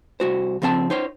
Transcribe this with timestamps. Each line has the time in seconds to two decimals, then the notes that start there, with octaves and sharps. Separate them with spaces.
0.20 C2 F#4 C5
0.62 C#3 F3 C4 E5 A5
0.90 D#4 C5 C#5